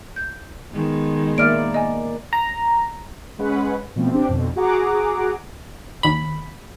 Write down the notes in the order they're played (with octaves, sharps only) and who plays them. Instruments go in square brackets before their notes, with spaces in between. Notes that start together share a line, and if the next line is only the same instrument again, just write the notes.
[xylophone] G6
[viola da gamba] D#3 G#3 B3
[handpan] A#3 D5 [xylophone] E5 F6 D7
[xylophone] D#5 G#5
[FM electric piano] A#5
[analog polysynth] G#3 C#4 B4 F#5
B2 F3 A3 C4
C4 D4 G4
F2 B2 D3
F#4 G#4 F#5 A#5 D6
[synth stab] D#2 B5